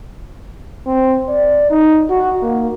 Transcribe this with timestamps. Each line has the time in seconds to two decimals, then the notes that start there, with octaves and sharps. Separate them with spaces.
0.87 C4
1.29 D5
1.70 D#4
2.10 F#4
2.42 A#3